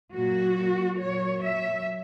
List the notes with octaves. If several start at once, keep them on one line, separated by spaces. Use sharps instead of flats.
A#2 F#3 F#4
A#2 F#3 C#5
E5